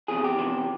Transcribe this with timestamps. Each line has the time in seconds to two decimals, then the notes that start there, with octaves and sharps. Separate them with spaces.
0.08 E2 C3 F3 G#4
0.24 G4
0.39 E2 C3 F3